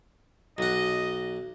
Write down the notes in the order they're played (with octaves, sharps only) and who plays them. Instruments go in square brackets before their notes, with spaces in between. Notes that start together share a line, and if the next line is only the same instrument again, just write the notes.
[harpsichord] B1 F#5 [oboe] D#5